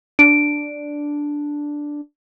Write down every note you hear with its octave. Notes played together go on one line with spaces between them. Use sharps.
D4 D7